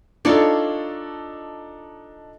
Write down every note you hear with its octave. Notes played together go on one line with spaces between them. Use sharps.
D4 D#4 F4 A4 C#5 D5